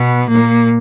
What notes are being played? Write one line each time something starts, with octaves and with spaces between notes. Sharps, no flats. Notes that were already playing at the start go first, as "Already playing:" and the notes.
Already playing: B2 B3
A#2 A#3